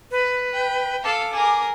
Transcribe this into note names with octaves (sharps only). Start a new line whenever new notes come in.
B4
G5
A4 F5 D6
G#4 A#4